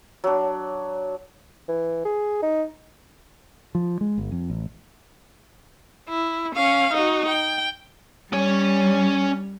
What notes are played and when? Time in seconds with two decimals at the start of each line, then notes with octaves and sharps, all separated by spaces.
0.24 F#3 D4
1.69 E3
2.05 G#4
2.43 D#4
3.75 F3
4.01 G#3
4.18 G1
4.31 F2
4.50 A1
6.09 E4
6.56 C#4 F5
6.94 D#4 F#4
7.29 G5
8.33 G3 C#4 C#5